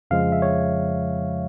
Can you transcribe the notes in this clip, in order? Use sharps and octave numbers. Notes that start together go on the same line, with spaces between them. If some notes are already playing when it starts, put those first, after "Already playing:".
F2 C#3 F3 G#3 F5
E5
C#5